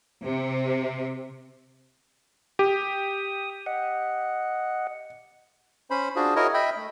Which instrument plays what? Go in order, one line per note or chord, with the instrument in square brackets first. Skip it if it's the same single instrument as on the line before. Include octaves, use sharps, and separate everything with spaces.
[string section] C3
[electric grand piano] G4 [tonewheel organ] D#6
[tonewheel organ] D#5 F#5
[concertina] C#4 C5 B5
D4 F4 F#4 G#4 C5
E4 F#4 G#4 A#4 C#5 D#5
D#5 E5 G5 B5
A3